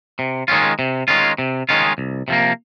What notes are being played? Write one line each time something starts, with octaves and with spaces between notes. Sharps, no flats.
C3
D#3 G#3 C#4 F4
C3
D#3 G#3 C#4 F4
C3
D#3 G#3 C#4 F4
C2
C3 F3 A#3